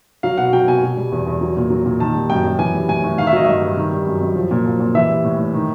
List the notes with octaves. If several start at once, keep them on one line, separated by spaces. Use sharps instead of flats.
F#3 F5
B2 F#5
F#3 G5
B2 G#5
B2
G3
E2
E2
F#3
A#2
F#3
A#2
D#3 A5
G3
F#2 G5
F#2
E3 G#5
G3
A2 G#5
A2
D#3 F5
E5
F#3 D#5
G2 E5
G2
D#3
G3
F#2
F#2
F3
A#2
F3
A#2
E3 E5
G3
A2
A2
D#3